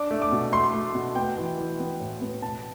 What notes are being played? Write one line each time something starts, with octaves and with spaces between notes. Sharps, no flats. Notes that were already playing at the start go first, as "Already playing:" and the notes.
Already playing: D4 D6
A3
D6
B2
A3 C6
A3
B2
B3 G5
E3
E3
B3
A2
B3
B2 A5